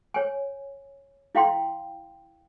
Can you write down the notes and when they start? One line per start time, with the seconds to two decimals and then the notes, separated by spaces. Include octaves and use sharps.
0.14 C#5 G#5
1.35 E4 F5 G5 C6